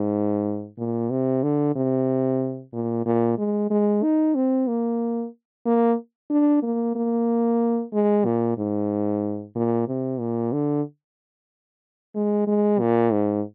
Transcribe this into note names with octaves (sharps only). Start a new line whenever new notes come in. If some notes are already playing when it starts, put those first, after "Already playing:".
Already playing: G#2
A#2
C3
D3
C3
A#2
A#2
G#3
G#3
D#4
C4
A#3
A#3
D4
A#3
A#3
G#3
A#2
G#2
A#2
C3
A#2
D3
G#3
G#3
A#2
G#2